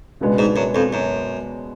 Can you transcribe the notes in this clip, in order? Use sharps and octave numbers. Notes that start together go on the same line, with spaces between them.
C#2 B2 G#3 B3 D4
G#2
F#2
F2
F#2